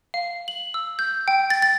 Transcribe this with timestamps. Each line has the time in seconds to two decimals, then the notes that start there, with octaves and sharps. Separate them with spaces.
0.14 F5
0.48 F#7
0.74 E6
0.99 G6
1.28 G5
1.50 A6
1.62 A6